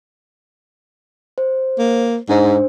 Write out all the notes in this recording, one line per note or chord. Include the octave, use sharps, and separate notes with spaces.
C5
A#3
G#2 D4 C5